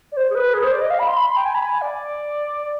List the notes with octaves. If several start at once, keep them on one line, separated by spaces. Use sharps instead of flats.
D5
C5
G#4
B4
G#4
C5
D5
D#5
F5
B5
C6
B5
C6
G5
G#5
B5
G#5
D5